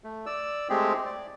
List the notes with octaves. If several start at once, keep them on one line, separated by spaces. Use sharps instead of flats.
A3
D5 E6
G#3 A3 C4 G4 G#4
D5